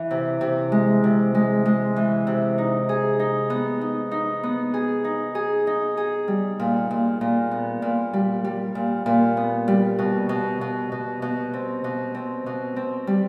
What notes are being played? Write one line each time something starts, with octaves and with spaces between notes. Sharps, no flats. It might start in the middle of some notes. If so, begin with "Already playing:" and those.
Already playing: E3
C3
C3
G#3
C3
G#3
G#3
E3
C3
D#4
G#4
D#4
B3
D#4
D#4
B3
G#4
D#4
G#4
D#4
G#4
G3
A#2
A#2
A#2
B3
A#2
G3
G3
A#2
A#2
B3
G3
B2
B2
B2
B2
B2
C4
B2
C4
B2
C4
G3